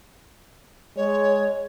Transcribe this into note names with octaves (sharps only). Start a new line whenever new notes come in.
G#3 C#5